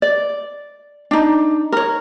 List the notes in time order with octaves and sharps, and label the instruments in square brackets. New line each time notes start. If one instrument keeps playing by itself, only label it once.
[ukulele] D5
D4 D#4
A#4 C#5